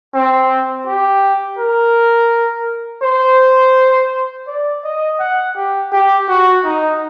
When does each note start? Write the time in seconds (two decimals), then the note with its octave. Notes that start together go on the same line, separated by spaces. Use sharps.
0.14 C4
0.87 G4
1.59 A#4
3.03 C5
4.47 D5
4.84 D#5
5.19 F#5
5.56 G4
5.93 G4
6.28 F#4
6.65 D#4